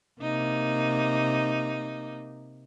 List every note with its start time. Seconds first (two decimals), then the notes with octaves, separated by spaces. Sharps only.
0.22 C3 A#3 D#4